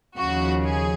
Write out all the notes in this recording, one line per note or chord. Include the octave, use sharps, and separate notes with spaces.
D#2 C#3 F3 F#4
G#4